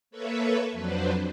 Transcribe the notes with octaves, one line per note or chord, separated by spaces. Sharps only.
A#3 A4 B4 C#5 E5
F2 F#3 D4 B4 C5